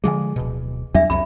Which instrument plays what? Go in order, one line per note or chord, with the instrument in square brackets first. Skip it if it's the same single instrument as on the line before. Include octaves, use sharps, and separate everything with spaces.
[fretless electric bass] D3 F3 G#3 [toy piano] G#4 G#5
[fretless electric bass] D1 B2
[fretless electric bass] E2 F#3 G3 [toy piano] D4 E5
[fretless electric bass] C2 F2 F#3 [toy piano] B5